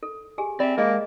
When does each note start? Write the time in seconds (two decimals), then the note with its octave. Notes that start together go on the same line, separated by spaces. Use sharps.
0.03 A4
0.38 G4 G#4 G#5
0.60 C4 D5 E5 B5
0.78 G#3 A#3 G#4 A#4 D#5